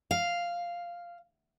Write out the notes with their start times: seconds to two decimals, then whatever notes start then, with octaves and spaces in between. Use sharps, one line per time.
0.11 F5